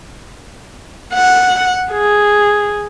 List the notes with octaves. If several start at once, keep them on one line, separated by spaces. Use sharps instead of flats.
F#5
G#4